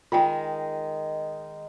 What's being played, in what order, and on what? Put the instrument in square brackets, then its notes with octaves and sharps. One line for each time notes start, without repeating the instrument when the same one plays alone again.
[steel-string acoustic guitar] D#3 G#3 [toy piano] F4 G5